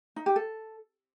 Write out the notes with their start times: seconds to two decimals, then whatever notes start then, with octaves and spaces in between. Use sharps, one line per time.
0.16 D#4
0.26 G4
0.36 A4